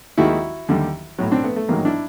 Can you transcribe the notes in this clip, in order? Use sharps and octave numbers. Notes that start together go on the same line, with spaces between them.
D#2 D#3 G#3 E4 F#4
D#2 D3 G3
B1 A2 F#3
C4 D4
A3 B3
A3
A1 G#2 D#3 F#3 A#3
D4 E4